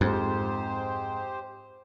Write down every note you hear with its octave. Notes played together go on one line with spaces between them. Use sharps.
F2 G#2 G4 C5